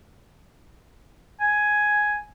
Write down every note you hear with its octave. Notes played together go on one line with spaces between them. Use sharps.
G#5